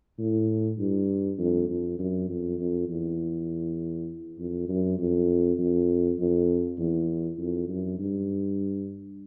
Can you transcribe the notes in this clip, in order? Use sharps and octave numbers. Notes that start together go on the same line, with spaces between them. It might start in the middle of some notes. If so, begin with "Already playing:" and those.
A2
G2
F2
F2
F#2
F2
F2
E2
F2
F#2
F2
F2
F2
E2
F2
F#2
G2